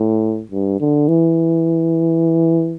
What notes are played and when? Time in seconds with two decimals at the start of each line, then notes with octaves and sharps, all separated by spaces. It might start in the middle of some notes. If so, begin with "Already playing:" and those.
Already playing: A2
0.51 G2
0.80 D3
1.08 E3